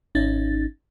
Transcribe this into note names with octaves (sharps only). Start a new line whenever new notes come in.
G#1 C#4 D#4 A6